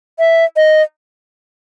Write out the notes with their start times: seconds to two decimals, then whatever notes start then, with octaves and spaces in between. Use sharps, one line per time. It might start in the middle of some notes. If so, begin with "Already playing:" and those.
0.19 E5
0.56 D#5